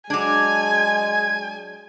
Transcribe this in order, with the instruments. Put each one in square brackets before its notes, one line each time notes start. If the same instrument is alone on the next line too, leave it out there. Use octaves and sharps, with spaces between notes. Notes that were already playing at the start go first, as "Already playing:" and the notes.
[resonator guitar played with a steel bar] F#3 D4 [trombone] G#3 [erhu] G#5 [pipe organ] G#6